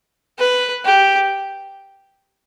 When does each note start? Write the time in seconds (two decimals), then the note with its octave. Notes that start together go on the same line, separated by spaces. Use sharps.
0.39 B4
0.85 G4